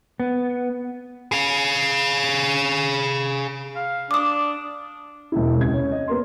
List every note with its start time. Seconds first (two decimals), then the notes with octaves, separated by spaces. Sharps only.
0.20 B3
1.32 G#4 F5
3.76 F5
4.11 D4 D6 D#6
5.32 E1 E4
5.57 C#2 C3 G#6
5.73 C#4
5.92 D#5
6.08 B3 A#4 C6